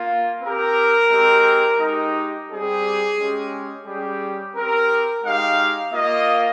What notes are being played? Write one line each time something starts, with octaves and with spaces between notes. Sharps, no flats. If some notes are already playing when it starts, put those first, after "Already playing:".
Already playing: A#3 F4
C4 G4 A#4
G#3 C4 G4
G#3 D#4 G4
G3 C4 G4 G#4
G#3 C#4 G4
G3 C#4 G4 G#4
C4 G4 A#4
G#3 D#4 G4 F5
A#3 F4 D#5